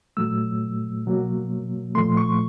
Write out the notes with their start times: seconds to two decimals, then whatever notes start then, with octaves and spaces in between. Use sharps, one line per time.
0.17 A#2 F#3 A3 E6
1.06 B2 F#3 A#3
1.95 A#2 F3 A3 C6
2.17 C#6